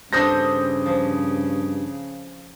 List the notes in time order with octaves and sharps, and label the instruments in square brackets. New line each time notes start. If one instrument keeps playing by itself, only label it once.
[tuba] G2 [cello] C#3 [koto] C4 D4 A4 [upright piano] D#6 G6 A#6
[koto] F3